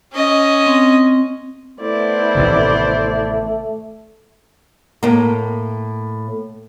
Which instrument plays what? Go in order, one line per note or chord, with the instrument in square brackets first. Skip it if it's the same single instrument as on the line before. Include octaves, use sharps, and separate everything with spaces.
[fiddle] C#4 D#5
[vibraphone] C4
[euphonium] A3 [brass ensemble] B3 C5 [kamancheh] E4 D5
[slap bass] A1 C3 D#3
[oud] A2 A#3